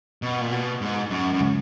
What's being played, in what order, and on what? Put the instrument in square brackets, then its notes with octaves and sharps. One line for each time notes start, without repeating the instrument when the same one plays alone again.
[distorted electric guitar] B2
A#2
B2
G#2
F#2
F#2
[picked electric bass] C#3 G#3